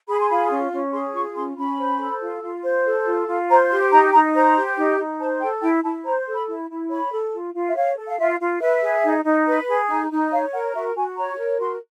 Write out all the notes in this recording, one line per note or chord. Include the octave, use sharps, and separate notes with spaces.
G#4 B5
C6
F4 B5
C#4
C#4
G#4 C6
F4 C#6
C#4 C6
C#4 B5
C5
A4
F4
F4
C5
A4
F4
F4
C5 A#5
G4 C6
D#4 A#5
D#4 A#5
C5 A#5
G4
D#4
D#4
C5 A5
A4 G5
E4 G5
E4 A5
C5 A#5
A4
B5
E4
E4
C#5 B5
A4
F4
F4
E5
C#5 F5
A4
F5
F4 E5
F4
B4 E5
G#4
D#4
D#4
B4
G#4
D#4
D#4
C#5 F5
A#4 F#5
F#4 E5
F#4 G#5
C#5 A#5
A#4
F#4 C6